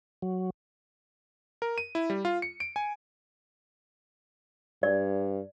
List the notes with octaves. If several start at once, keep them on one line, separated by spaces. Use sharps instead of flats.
F#3
A#4
D#7
E4
G3
F4
C#7
D7
G#5
G2 D5